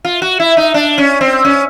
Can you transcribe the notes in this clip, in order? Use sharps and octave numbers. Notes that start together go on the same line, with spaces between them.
F4
F#4
E4
D#4
D4
C#4
C4
C#4